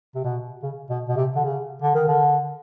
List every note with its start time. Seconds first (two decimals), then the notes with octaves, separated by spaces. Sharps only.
0.15 C3
0.24 B2
0.63 C#3
0.90 B2
1.08 B2
1.16 C3
1.36 D3
1.44 C#3
1.82 D3
1.94 D#3
2.08 D3